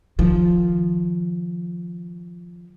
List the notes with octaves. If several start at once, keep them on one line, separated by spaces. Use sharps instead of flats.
D#3 F3